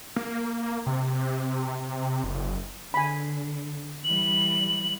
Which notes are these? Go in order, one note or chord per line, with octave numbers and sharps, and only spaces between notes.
A#3
C3
F#1
D3 G#5 B5
E3 G3 F#7